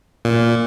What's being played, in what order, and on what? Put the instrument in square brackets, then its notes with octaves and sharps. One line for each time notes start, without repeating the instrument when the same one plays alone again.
[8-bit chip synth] A#2